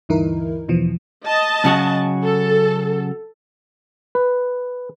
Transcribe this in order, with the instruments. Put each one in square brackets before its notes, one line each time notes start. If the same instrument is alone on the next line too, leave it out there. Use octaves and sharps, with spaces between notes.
[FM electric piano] D2 G2 E3 D#4 E4 A#4
E2 B2 E3 F3
[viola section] D#5 A5
[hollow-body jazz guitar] C#3 F#3 F#4
[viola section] A4
[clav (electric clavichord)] B4